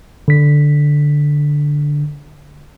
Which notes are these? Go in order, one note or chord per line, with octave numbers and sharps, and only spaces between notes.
D3 B6